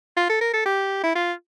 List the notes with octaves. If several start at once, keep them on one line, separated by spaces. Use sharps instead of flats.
F4
A4
A#4
A4
G4
E4
F4